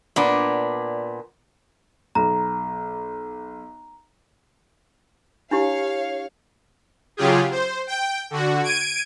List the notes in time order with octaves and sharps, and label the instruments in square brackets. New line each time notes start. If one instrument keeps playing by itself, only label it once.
[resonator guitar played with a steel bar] A#2 B3 D4
[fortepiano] B1 [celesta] A#5
[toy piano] D4 E4 G4 [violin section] C#5 F5
[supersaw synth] C#3 F#3 F4 G4 G#4
C5
G5
D3 F#4
G#6 D7 D#7